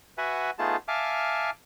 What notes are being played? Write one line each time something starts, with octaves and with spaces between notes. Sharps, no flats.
F#4 B4 E5 F#5 G#5
A3 B3 D#4 F4 G#4 A5
E5 F5 G#5 A5 D6 F6